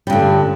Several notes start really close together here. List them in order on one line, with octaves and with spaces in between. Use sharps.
G3 G2 D3